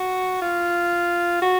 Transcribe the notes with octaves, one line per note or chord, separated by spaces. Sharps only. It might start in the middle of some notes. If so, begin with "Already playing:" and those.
Already playing: F#4
F4
F#4